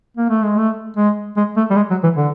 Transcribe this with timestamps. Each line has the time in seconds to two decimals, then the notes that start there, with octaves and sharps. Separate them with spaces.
0.17 A#3
0.30 A3
0.44 G#3
0.57 A3
0.97 G#3
1.37 G#3
1.57 A3
1.70 G3
1.76 G#3
1.91 F#3
2.04 E3
2.16 D3